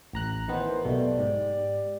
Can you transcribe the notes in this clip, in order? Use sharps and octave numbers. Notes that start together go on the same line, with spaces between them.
A1 A#5 F#6
D#3 E3 B3 A#4 C5
B1 B2 A3 G4 D5
G#2